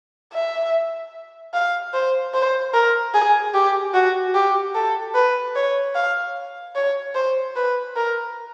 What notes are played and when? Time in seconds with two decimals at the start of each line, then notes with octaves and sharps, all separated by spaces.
0.33 E5
1.54 F5
1.93 C5
2.34 C5
2.74 A#4
3.14 G#4
3.54 G4
3.94 F#4
4.34 G4
4.75 A4
5.15 B4
5.55 C#5
5.95 F5
6.75 C#5
7.15 C5
7.56 B4
7.96 A#4